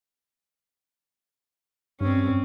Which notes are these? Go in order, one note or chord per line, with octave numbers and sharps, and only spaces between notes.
G2 C4 C#4